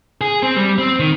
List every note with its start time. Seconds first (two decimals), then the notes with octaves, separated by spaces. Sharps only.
0.21 G#4
0.43 C4
0.56 G3
0.78 C4
1.00 D#3